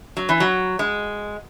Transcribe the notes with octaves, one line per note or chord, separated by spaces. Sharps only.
F#3
E3
F#3
G#3